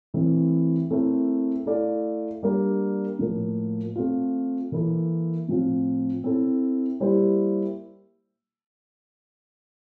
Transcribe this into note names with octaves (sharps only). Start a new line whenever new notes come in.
E3 A3 C4 E4
A3 C4 E4 A#4 E5
A3 E4 A4 D5 F5
G3 A#3 D4 G4
A2 F3 A#3
A3 C4 F4
E3 A#3 E4 A4
A2 F3 C4 F4
C4 E4 A4
G3 A#3 E4 G4 C5